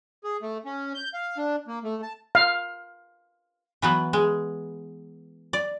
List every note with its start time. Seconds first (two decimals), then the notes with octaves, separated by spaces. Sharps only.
0.24 G#4
0.42 A3
0.65 C#4
0.95 G6
1.14 F5
1.37 D4
1.68 A#3
1.84 A3
2.03 A5
2.35 F5
3.82 E3 F#3 B3
4.13 G#3
5.53 D5